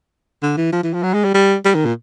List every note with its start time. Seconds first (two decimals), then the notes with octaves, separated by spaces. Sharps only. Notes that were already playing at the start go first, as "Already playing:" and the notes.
0.42 D3
0.58 E3
0.73 F3
0.83 E3
0.94 F3
1.03 F#3
1.14 G#3
1.24 G3
1.34 G3
1.65 G3
1.75 D#3
1.85 A#2